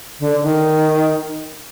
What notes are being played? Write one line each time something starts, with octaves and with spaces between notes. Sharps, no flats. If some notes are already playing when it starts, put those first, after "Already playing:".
D3
D3
D#3